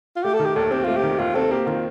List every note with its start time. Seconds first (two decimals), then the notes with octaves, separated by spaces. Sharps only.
0.16 F4
0.24 A3 G4
0.34 A4
0.39 D#3
0.45 G4
0.56 D#2 A4
0.71 C4 G4
0.84 A3 F4
0.97 G4
1.03 D#3
1.19 D#2 F4
1.35 C4 A4
1.51 A#3 G4
1.67 D#3 F4